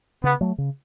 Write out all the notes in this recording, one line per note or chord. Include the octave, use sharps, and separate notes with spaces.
C#3 B3
F#3 A3
C#3